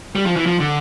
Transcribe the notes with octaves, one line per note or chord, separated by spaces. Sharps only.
G3
F3
E3
F3
D3